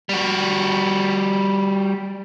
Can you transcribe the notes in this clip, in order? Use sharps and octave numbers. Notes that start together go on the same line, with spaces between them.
G3 F#4